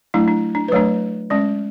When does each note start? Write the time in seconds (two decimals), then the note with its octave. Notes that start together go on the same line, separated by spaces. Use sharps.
0.14 F#3 A3 D4 E4
0.28 D4
0.55 D4
0.68 B4
0.72 F#3 A3 D4 C#5
1.30 G#3 C#4 D5